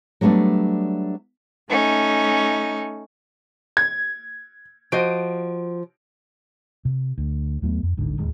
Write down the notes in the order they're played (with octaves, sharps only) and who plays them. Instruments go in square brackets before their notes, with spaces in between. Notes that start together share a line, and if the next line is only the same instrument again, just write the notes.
[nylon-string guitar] F#3 G3 A3 B3 D4
[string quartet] A3 C#4 D#4
[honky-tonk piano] G#6
[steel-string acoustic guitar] F3 [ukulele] F#4 C5 D#5 [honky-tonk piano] D7
[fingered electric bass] C3
D2
D#2 F#3 A3 B3
F2
D1 G#1 G#2 D3
D1 D#2 G#3